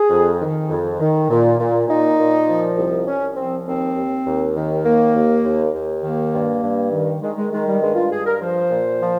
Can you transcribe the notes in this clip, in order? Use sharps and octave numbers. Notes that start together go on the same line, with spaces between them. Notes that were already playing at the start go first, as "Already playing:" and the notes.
Already playing: G#4
F2
D#3
F2
D#3
A#2
A#2
A#2 D#4
A#2
F3
C2
C2 C#4
F3 C4
D#2 C4
D#2
D#2
D#3
D#2 A#3
D#2
D#2
D#2
D#3 A#3
G2
G2
D#3
D#3 G#3
G#3
D#3 G#3
G3
G2 G#3
F4
G2 G#4
A#4
F3 C5
A#2
F3